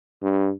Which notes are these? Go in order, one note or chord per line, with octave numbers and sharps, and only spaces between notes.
G2